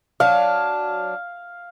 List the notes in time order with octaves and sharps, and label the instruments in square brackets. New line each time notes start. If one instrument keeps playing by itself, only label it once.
[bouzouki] F#3 D4 [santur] F5